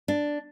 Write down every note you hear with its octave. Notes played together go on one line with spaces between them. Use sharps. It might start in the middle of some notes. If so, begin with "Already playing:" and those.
D4